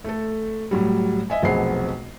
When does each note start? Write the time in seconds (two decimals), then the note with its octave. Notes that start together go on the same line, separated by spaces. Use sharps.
0.04 A3 A4
0.71 A2 F#3 G3
1.30 D#5 E5 G#5
1.42 F1 B1 B3 C4 G#4 C7